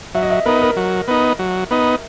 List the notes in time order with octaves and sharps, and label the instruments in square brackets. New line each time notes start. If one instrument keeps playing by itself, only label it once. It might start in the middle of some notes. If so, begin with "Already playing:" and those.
[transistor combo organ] F#3 [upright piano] E5
[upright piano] D#5
E5
[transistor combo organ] B3 D#4 [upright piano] A#4
[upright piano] A#4
[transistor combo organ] F#3
B3 D#4
F#3
B3 D#4